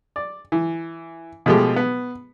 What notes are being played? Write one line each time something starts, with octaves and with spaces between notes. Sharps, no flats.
D5
E3
B2 F3 G#3 A3 G4
B3